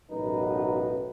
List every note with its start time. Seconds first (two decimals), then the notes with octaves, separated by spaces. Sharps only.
0.10 A1 F#2 B2 D#4 B4